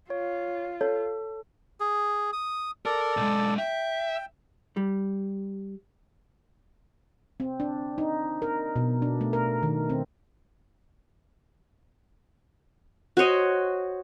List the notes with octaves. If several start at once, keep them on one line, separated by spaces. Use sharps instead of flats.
F4 C#5
A4 C#5
G#4
D#6
A4 A#4 D5
B1 G#3
E5 G5
G3
C4
D4
D#4
A#4
B2
D4
A3
A#4
D#3
C4
F#4 C5 C#5 D#5